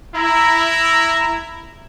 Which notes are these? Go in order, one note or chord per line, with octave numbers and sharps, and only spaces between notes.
E4 A#5